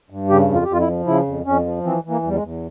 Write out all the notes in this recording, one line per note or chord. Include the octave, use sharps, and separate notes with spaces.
G2
C#3 G4
F2
F4
G4
F2 F4
E4
F3
C#3 E4
F2
F2 C#4
F3
E3 C4
E3
A#3
E2 G3
G#3
E2